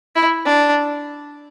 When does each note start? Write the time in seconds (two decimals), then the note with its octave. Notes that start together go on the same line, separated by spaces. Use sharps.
0.16 E4
0.46 D4